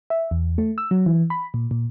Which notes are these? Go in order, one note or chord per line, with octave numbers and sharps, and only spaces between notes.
E5
E2
A3
E6
F#3
E3
B5
A#2
A#2